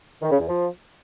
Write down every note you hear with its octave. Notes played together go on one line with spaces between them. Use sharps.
D#3
C#3
E2
F3